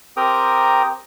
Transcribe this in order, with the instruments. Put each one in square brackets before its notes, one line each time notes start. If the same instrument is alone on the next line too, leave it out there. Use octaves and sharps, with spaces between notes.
[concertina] C4 G4 A#4 G5 A#5 D#6